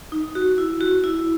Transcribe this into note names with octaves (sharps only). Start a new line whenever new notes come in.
D#4
F#4
E4
F#4
E4